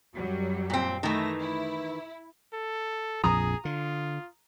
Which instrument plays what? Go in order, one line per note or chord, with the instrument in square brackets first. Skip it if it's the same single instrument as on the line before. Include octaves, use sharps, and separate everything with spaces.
[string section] F#2 F#3 G3
[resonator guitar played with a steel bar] A#2 C4
[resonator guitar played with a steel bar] D#3 E3 [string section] A3 A#6
[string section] E4
[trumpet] A4
[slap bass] A#1 F2 A#2 [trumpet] G#4 [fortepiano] A#5 D#6
[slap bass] D3 [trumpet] F4